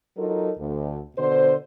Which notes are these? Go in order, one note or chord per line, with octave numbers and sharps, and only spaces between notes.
F#3 D#4 F4 A4 A#4
D2
B2 D3 C5